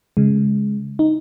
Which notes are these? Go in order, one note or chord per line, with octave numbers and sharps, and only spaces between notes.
C#3 G#3
D#4